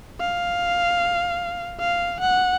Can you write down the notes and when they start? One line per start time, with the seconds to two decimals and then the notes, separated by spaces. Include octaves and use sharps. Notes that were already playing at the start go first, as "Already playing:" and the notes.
0.20 F5
1.80 F5
2.20 F#5